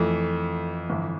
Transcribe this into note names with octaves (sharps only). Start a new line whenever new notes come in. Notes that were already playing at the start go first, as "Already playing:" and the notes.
Already playing: F2 E3 A3
G1 F2 E3